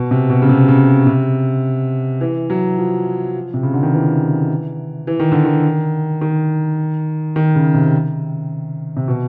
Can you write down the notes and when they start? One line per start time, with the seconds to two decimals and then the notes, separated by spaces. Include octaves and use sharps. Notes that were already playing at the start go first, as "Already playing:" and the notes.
Already playing: B2
0.11 C3
0.30 B2
0.42 C#3
0.49 C3
0.68 C#3
1.07 C3
2.21 E3
2.50 F#3
2.78 F3
3.54 C3
3.63 C#3
3.73 D3
3.83 D#3
3.93 E3
5.07 E3
5.20 D#3
5.32 D3
5.45 D#3
6.21 D#3
7.36 D#3
7.55 C#3
7.74 C3
8.97 C3
9.08 B2